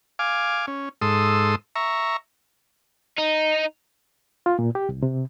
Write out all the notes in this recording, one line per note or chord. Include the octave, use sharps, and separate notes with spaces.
F5 G#5 D6
C#4
G#2 A4 C6 D#6 E6
E5 A#5 C#6
D#4
F4
A#2
G4
C2
C3